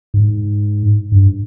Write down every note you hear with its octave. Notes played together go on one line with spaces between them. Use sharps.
G#2
G2